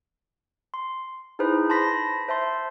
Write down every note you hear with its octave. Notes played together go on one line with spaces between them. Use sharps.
C6
D#4 E4 G#4 B4 C5 B5
A5 B5 C6 A#6 B6
C5 E5 A5 C6